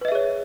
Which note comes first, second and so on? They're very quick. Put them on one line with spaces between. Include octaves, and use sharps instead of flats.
B4 D#5 E5 G#4 C#5